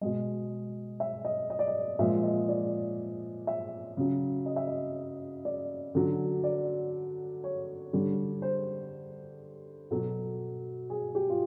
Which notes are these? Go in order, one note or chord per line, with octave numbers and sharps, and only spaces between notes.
B2 G#3 D#5
E5
D#5
D#5
D5
D#5
A#2 F3 G#3 E5
D#5
D5
E5
C#3 F#3
D#5
E5
D#5
D5
D3 F#3
D5
C#5
D3 G3
C5
B2 F#3 A4
G#4
G4
F4